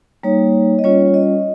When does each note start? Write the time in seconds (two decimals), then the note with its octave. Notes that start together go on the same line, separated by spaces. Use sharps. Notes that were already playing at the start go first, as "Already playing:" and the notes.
0.23 G3 A#3 D#4 C#5
0.79 D#5
0.84 G3 C#4 F4 C#5
1.14 D#5